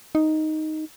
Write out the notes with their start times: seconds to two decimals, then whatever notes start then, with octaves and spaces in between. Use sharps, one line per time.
0.15 D#4